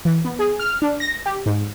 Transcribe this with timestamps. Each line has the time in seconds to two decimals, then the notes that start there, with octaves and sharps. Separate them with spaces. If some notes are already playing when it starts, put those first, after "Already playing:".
0.05 E3
0.25 B3
0.39 G#4
0.59 F6
0.82 D4
1.00 A#6
1.26 G4
1.46 G#2